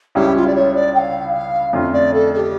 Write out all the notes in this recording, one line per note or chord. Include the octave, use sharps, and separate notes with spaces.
C#2 C#3 G3 C#4 E4 G4
F4
D5
C#5
D5
G5
F5
F5
F2 D3 A3 C#4 F4
D5
A4
A4
G4